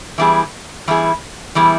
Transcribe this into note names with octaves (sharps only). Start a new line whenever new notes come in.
E3 G3 B3 E4 G#4
E3 G3 B3 E4 G#4
E3 G3 B3 E4 G#4